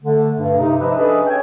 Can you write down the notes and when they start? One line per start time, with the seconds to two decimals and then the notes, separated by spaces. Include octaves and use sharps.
0.03 D3 A3
0.38 G2
0.58 C3 D#4
0.81 F3 G4 B4 D#5 E5
0.96 C#4 D4 G#4 A4 B4 D#5
1.26 C#5 E5 G5 G#5